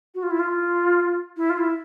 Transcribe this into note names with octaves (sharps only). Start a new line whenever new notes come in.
F#4
F4
E4
F4
E4
F4
E4